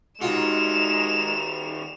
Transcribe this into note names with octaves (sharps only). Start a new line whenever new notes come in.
D#3 G3 G#3 F4 F#4 E7 F7